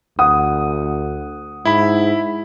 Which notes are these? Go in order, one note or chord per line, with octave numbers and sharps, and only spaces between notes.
D2 F#5 D#6
G#2 E4 B5